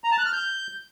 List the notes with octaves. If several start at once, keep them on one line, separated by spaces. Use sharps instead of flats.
A#5
A5
F#6
F6
G6